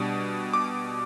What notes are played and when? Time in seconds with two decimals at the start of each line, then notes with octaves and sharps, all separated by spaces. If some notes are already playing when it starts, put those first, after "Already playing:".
Already playing: B2 G3 D4
0.53 D6